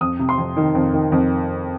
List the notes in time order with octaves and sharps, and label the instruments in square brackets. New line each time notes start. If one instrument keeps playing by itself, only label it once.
[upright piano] F2 D#6
C3
C6
F2
D#3
F2
D#3
F2